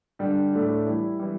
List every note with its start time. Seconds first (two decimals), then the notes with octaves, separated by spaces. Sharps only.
0.19 D3 G3 D4 G4
0.53 A2 A3 D4
0.86 E3 G3 E4
1.19 E3 G3